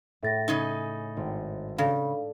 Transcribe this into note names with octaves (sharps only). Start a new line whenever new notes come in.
A2 E5 A6 A#6
C#3 C#4 D#4
G#1
C#3 D4 A4 D5 F5